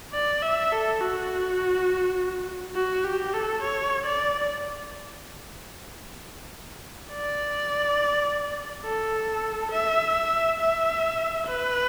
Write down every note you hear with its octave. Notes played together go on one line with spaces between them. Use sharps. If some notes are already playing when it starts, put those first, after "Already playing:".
D5
E5
A4
F#4
F#4
G4
A4
C#5
D5
D5
A4
E5
E5
B4